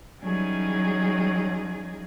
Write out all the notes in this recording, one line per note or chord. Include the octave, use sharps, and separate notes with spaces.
E3 F#3 G3 C#4 D#4 G#4